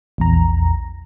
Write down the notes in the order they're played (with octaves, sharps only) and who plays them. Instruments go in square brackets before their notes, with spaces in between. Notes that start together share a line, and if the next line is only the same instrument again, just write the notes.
[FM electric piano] A#1 E2 A#5